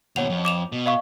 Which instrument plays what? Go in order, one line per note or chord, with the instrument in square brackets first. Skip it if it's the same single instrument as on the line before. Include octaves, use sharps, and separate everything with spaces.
[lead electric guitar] D#2 B2 [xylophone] C#5 F#5 F7
[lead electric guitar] F2
[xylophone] D6 E7 F7
[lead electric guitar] B2
[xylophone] D#5 F5 C#6